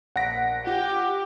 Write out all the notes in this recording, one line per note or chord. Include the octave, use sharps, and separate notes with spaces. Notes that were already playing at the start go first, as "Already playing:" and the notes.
A#1 F#5 A#6 B6 D7
F4 G4